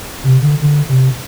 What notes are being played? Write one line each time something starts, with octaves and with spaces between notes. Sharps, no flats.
C3
D3
D3
C3